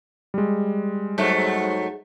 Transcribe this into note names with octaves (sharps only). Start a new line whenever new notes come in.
G3 G#3
G#2 F#3 A3